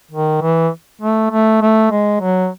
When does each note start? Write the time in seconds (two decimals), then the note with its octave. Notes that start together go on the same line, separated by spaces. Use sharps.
0.11 D#3
0.41 E3
1.01 A3
1.31 A3
1.62 A3
1.91 G#3
2.21 F#3